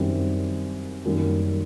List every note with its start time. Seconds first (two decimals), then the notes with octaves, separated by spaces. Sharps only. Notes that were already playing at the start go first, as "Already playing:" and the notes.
Already playing: F#2 D#3 G3 C4 E4
1.05 F#2 D#3 G3 A#3